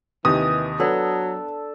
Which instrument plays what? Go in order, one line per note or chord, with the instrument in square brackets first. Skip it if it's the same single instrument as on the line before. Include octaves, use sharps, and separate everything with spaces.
[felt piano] D#2 C3 D#3 [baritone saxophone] E3 [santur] D6 [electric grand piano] D#6
[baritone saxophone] F#3 [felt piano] B3 [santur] D4 A4